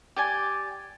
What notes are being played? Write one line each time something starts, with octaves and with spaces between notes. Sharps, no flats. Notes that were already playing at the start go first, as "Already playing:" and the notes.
G4 D5 G#5